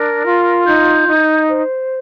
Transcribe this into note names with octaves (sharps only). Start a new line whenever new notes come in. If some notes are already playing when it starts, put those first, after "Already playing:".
Already playing: D4 A#4
F4
D#4 G6
D#4
C5